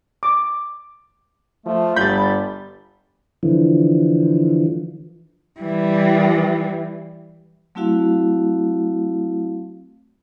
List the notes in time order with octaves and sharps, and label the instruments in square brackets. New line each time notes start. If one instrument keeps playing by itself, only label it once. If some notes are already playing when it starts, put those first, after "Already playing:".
[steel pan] D6
[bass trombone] F3 [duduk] A3
[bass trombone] G1 [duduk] G3 [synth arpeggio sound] B5 A6 [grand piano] G6
[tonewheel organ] D3 E3 F3
[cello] E3 G3
[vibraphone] F#3 A3 C4 E4 F#4 F5